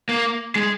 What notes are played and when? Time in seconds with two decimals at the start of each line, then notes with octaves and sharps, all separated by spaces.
0.09 A#3
0.56 G#3